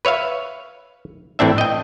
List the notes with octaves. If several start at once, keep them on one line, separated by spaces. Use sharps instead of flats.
B4 C#5 E5 F5
A2 E3 C4 D4 E5
D#5 G5